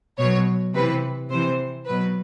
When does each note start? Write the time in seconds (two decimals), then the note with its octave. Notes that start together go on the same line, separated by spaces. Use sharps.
0.18 B2 F#3 C#5
0.74 C3 E3 B4
1.29 C3 E3 C5
1.86 B2 F#3 B4